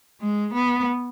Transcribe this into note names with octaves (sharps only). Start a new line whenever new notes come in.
G#3
B3